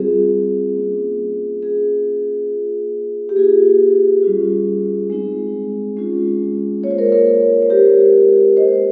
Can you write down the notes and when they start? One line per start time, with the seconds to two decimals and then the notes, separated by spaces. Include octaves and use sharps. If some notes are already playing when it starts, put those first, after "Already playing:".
Already playing: G3 C4 F4 G#4
0.76 A#3 C#4 F4
1.62 A#3 C#4 F4 G#4
2.49 A#3 F4
3.29 G4
3.36 A#3 F4 G#4
4.23 G3 C#4 F4
5.10 G#3 C4 D#4
5.97 G#3 C#4 F4
6.83 A#3 C#5
6.87 F4 C5
6.98 A#4 C#5
7.12 A#4 C#5
7.62 C5
7.70 G#3 C4 F4 G4 A#4
8.57 A#3 D#4 C5 D#5